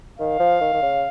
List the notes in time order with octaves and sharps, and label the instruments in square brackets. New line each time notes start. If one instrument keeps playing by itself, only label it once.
[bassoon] D#3 [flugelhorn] F5
[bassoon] F3
D#3
D#3
C#3